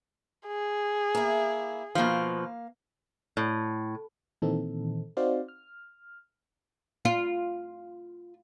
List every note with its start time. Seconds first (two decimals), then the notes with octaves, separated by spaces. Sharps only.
0.47 G#4
1.15 A#3 E4
1.95 B2 F3 A#3 F5
3.37 A2
4.42 A#2 D#3 E3 C4 D#4 A4
5.17 C4 D#4 F#4 C5 D5 F5
5.48 F6
7.05 F4